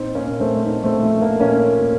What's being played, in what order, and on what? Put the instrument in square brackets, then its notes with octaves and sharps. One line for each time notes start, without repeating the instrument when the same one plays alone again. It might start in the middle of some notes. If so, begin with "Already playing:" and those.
Already playing: [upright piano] A#2 C4 D#4
A#3 C#4
A#2
A3 C4
A3 C4 D#4
A3 C4
F3 A3
A#3
A#2 A#3 C#4
A#2